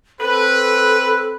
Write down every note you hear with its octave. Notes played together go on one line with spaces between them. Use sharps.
C4 A4 B4